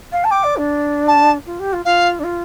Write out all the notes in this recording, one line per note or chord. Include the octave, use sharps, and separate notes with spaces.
F5
A5
G5 D6
D5
D4
A5
F4
G4
F4
F4 F5
D4
F4